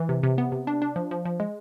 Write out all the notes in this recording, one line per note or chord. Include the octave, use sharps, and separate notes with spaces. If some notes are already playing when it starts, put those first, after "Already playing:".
Already playing: E3
C3
C3
B3
C3
D4
D4
F3
F3
F3
G#3